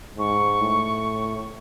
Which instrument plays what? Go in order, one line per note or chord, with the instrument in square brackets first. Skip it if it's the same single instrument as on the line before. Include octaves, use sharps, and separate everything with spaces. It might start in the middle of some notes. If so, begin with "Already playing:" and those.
[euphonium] G#2 [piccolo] C#6
[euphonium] A2